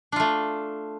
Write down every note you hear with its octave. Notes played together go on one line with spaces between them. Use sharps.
A3 D4 F4